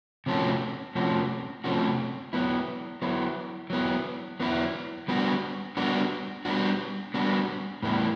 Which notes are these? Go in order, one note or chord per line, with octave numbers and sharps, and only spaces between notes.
C3 F3 A3 C#4 F#4
C3 F3 A3 C#4 F#4
C3 F3 A3 C#4 F#4
F#3 B3 E4
F#3 B3 E4
F#3 B3 E4
F#3 B3 E4
G3 B3 D4 F#4
G3 B3 D4 F#4
G3 B3 D4 F#4
G3 B3 D4 F#4
A2 E3 G3 B3 E4